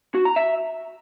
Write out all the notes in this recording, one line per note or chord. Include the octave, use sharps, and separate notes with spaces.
F#4
A#5
E5